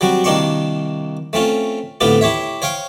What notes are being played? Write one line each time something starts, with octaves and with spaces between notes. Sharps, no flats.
F#3 G3 C4 F#4
C2 D#3 A#3 D4 C6 C#6
A3 C4 C#4 F4
A2 D3 B3 C4 F4 G4
E4 G4 C#5 E5
C5 C#5 F5 G5 C6